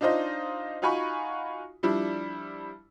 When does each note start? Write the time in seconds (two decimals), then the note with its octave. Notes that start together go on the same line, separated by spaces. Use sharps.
0.01 D4 D#4 F4 C5 D#5
0.82 D#4 F4 F#4 G#5 B5 C#6
1.83 F3 G3 D4 E4